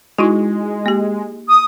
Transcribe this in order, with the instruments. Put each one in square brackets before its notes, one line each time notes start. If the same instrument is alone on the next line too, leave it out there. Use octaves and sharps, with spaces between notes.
[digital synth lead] G#3 [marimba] D#4 E4 F#4
[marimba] A#3 G4
[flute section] D#6